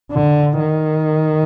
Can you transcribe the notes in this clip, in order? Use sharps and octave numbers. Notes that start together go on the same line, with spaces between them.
D3
D#3